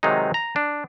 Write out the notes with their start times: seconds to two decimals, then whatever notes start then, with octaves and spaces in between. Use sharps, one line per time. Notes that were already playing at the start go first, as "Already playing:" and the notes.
0.03 C3 D#3 F#3 G#3 D#4
0.34 A#5
0.56 D4